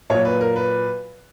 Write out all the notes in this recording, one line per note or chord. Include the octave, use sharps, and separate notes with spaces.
A#2 F#3 C#5
B4
A#4
B4